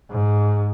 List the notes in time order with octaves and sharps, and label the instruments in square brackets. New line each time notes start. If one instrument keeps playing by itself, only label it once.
[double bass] G#2